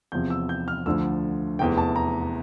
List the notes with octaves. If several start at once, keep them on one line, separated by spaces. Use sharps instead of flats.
E2 C3 F3 G6
E6
G6
F6
D2 D3 F3 E6
F1 E2 E3 G5
A5
A#5